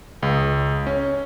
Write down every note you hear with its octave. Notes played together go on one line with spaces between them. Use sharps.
C#2
C#4